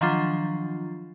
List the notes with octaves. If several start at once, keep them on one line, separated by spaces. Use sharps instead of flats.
D#3 F3 F#3 D4 F4